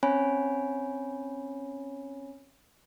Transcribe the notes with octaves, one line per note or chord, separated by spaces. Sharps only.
C4 C#4 C#5 G#5 B5